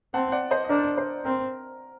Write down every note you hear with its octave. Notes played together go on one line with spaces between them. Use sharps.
C4 F#5 A5
D5 F#5
C5 D#5
D#5
D4 A#4 D5
C5
C4 A#4